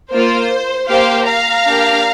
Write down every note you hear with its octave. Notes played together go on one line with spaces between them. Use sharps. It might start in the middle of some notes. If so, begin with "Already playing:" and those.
A#3 F4 C5
A#3 G4 C5 F5
F5 A#5
A#3 D4 G4